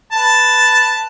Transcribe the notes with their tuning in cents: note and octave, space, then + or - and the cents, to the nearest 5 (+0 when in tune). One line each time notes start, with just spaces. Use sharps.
B4 +0 A5 +0